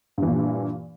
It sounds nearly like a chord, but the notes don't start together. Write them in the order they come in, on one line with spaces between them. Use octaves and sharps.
G2 E3 A#2